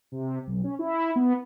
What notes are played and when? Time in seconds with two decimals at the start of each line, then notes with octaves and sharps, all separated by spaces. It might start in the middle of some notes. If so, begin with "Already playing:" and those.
0.12 C3
0.47 B1
0.64 C#4
0.79 E4
1.16 B3